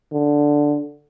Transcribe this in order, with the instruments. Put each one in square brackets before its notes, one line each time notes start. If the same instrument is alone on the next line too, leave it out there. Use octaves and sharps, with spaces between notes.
[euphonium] D3